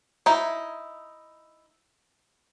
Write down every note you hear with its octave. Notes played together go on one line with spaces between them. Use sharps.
D#4 E4